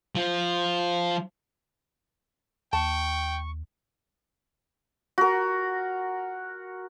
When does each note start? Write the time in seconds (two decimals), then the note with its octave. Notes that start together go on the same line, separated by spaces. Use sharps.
0.15 F3
2.73 D#2 G5 A5 C#6
5.18 F#4 A#4